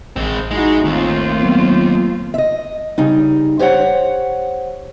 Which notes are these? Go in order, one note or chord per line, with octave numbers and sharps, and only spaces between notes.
A1 G#3 C4
G#3 D#4 E4 F#4
D#2 A3 C4 F4
F#3 A#3 B3
D#5 E5
C#3 G3 D#4
G4 C5 C#5 F#5